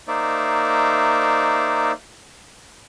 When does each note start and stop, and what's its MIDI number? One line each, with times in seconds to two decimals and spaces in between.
0.08 1.92 58
0.08 1.92 63
0.08 1.92 72
0.08 1.92 74
0.08 1.92 76